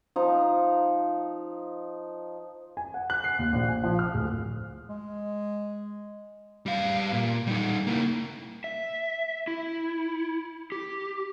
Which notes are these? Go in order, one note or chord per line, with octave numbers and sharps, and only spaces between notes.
F3 D#4 A#5
G#5
F#5
F#6
C7
D#2
A#1
G#5
F3
F6
D1
G#3
G3 F5
A#2
G3 D#4
A#3 E4
E5
E4
G4